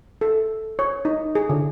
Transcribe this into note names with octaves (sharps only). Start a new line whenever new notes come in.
A4
C#5
D#4
G#4
D3